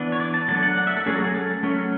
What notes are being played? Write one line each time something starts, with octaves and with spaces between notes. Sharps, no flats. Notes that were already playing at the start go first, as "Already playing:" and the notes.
Already playing: E3 B3 D4
C#5
D5
A5
F#3 A3 D4 A5
F#5
F#5
E5
A4
F#3 A3 C#4 G#4
F#4
G#4
A4
F#3 A3 C#4